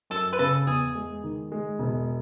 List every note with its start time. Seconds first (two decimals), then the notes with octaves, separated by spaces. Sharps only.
0.10 F#2 A4
0.33 B4
0.39 C#3 A4
0.67 E2 G#4
0.95 G#3
1.23 D#3
1.52 G#3
1.79 E1